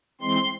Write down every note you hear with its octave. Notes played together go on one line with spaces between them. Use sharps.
E3 G#3 C4 C6